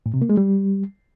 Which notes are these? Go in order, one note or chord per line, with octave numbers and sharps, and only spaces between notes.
A2
C3
A#3
G#3
G3